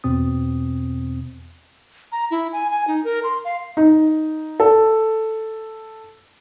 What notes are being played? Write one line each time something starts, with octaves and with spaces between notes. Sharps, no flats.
E2 B2 C4 D#6
A#5
E4
G#5
G#5
D#4
A#4
C6
F5
D#4
A4